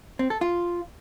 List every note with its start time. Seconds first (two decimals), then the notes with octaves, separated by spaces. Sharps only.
0.19 C4
0.30 A4
0.41 F4